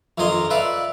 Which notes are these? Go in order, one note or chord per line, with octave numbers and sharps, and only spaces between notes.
A#1 F2 D#3 D#5 A#5 C6
B4 D5 E5 F5